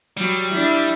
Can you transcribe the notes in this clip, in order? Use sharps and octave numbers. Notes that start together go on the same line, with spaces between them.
F#3 G3
D4 E4